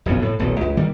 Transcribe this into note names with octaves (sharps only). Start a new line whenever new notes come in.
F#1 B1 F2 B3
A2
D#1 B1 A3
C#2
D#3 G3 A#3